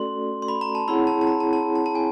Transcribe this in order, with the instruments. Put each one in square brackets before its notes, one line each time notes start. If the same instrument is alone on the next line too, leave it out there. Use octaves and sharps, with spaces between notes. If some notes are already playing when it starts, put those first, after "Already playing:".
Already playing: [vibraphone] A3 C#4 F#4 A4 D5 [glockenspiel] C6
[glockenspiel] C6
B5
A#5
A5
[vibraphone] C4 E4 G#4 C#5 F#5 [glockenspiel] B5
[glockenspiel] A5
A5
A#5
A5
A5
A5
A5
G#5